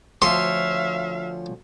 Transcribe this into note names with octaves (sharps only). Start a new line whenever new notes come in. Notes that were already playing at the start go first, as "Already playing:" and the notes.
D2 F3 C#5 E5 F5 C6